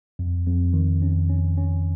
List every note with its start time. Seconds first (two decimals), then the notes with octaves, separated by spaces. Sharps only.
0.19 F2
0.46 F2
0.73 D#3
1.02 C#4
1.29 C#4
1.58 C#4